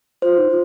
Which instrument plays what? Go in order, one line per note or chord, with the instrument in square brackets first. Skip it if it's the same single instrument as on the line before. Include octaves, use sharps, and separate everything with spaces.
[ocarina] F4 [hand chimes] C5
[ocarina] D#4
F4